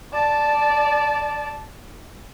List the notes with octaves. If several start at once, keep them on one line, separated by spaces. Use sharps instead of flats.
D5 A5